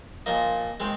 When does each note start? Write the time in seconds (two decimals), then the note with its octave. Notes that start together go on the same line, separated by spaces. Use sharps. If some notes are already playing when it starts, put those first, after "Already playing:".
0.26 A#2 F3 A#3 D#5
0.80 D#3 G#3 C4